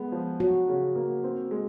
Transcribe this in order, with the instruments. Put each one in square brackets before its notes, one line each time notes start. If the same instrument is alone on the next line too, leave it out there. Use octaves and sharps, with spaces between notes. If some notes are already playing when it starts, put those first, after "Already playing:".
Already playing: [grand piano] G#3 B3
F3
[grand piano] F#3 [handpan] F#4
[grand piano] C#3
A#3
C4
G#3